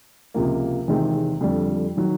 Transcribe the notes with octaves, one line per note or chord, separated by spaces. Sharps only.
C#2 C3 F3 A#3
E2 C3 D#3 G#3 C4
F2 D3 G3
D#3 F#3